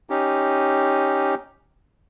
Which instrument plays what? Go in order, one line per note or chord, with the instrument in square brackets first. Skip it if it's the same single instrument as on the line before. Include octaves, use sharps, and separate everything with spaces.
[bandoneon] C#4 D#4 G4